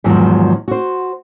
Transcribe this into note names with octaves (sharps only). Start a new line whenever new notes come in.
E2 G#2 D#3 F3 F#3
F#4 C5